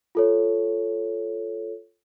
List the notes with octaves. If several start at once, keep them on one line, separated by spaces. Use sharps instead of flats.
F4 A4 C#5